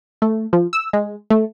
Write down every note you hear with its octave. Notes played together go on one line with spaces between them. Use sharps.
A3
F3
E6
G#3
A3